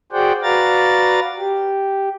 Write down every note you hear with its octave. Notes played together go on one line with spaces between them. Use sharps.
F#4 G#4 C5 D5 F#5 G5
F#4 B4 D5 F5 A#5 A6
G4